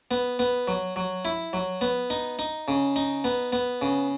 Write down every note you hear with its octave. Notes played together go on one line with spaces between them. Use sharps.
B3
B3
F#3
F#3
E4
F#3
B3
D#4
D#4
C#3
D#4
B3
B3
C#3